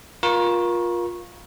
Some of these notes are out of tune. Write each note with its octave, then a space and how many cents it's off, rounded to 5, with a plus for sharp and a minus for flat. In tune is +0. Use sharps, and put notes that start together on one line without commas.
F4 +15 A#4 +30 C#6 -15